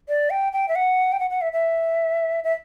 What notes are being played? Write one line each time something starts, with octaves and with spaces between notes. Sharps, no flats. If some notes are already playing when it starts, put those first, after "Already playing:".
D5
G5
G5
E5
F#5
G5
F#5
F#5
E5
E5
E5